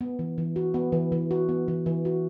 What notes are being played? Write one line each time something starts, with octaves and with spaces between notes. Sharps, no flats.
B3
E3
E3
F#4
B3
E3
E3
F#4
B3
E3
E3
F#4